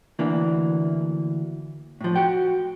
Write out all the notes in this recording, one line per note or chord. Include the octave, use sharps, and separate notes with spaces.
D2 E3 A#3 D4
A2 F3
F#4 G5